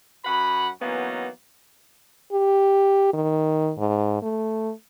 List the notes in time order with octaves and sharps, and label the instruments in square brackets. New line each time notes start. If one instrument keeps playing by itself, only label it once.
[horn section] F#2 F#4 F#5 B5
E3 F#3 A#3 B3 C#4 D#4
[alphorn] G4
D#3
G#2
A3